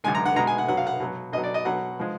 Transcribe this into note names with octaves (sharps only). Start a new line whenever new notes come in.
F#2 D3 G#3 G#5
A#5
F#5
B2 G#3 A#5
G#5
F#5
B2 F#3 F#5
F5
F#5
B2 F#3
B2 D#5
F#3
D5
D#5
B2 F#3 F#5
F3 G#3